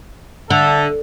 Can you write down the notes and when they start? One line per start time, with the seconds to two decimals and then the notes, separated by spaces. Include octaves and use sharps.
0.50 D3 A4 E5